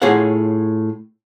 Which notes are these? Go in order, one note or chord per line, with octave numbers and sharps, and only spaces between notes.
A2 F4 G#4 C#5 F#5